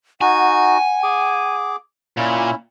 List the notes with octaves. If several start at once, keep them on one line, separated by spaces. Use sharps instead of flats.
D#4 F#4 F#5 G#5
G#4 D6
A#2 C#4 E4